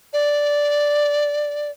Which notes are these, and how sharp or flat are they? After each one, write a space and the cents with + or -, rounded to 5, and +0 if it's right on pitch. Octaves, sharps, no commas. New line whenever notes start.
D5 -5